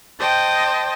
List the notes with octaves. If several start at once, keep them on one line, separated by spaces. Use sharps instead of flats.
C5 D#5 G5 A5